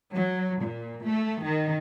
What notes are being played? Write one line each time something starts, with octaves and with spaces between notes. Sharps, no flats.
F#3
A#2
A3
D#3